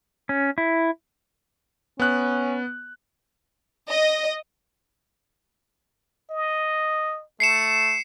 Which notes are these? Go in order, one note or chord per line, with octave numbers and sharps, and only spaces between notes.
C#4
E4
B3 C#4 F#6
D#5
D#5
A3 C7 C#7 E7